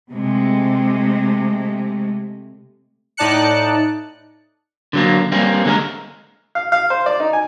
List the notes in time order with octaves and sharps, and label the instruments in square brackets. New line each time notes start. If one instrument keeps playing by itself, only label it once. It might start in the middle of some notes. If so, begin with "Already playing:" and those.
[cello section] C3 G#3 A3
[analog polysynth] A2 D#4 D5 A5 F#6 C#7
[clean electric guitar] D3 F#3 A#3
G3 A#3 C4 C#4
D3 G#3 A#4
[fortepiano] F5
F5
C5
D5
D#4
G#5